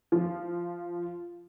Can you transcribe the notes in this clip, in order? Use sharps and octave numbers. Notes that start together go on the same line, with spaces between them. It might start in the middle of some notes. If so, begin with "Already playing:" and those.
F3 F4